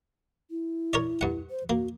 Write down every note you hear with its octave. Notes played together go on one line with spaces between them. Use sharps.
E4
A#4 C#5 D5
G2 F#5
C5
A#3 F#4